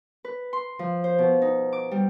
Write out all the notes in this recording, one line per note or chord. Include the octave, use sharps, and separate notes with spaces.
B4
C6
F3
C5
B2
D#4
D6
G3